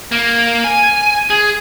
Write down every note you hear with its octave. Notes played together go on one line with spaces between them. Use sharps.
A#3
G#5
G#4